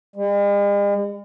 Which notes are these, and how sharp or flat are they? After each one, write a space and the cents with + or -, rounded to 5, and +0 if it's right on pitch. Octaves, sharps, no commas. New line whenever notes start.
G#3 -45